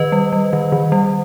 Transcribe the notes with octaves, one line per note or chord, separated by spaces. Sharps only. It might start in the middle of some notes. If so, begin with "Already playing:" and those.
Already playing: D#3 B4 D#5
G3
G3
D#3
D#3
G3